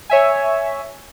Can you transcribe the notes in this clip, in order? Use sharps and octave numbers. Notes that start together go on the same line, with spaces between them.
C#5 E5 G#5